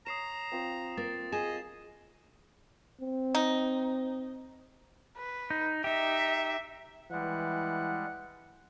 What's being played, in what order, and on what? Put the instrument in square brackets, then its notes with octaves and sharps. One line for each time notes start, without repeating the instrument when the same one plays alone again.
[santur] C#5 [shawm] A#5 [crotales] D#6 C7 E7
[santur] C4 F4 C5
[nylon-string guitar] A#3 [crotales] A6
[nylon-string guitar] G#4 [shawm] D#5 [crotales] E7
[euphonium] C4
[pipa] D#4
[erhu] B4
[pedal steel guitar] D#4
[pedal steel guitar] D#4 G4 [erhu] E5
[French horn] E3 [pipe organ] G3 G#3 [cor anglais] F#5